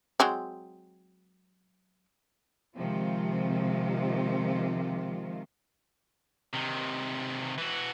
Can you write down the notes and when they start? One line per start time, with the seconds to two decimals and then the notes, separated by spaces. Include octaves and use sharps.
0.20 F#3 G#3 C4
2.75 C3 D#3 F3 G#3 F4
6.53 C3 D#3
7.58 E3 F#4